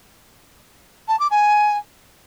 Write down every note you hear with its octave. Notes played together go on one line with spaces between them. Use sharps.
A5
D6
G#5